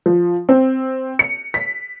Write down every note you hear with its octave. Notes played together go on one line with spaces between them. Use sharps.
F3
C4
C#7
B6